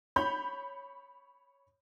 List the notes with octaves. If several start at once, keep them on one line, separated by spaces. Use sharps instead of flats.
C#5 B5 G6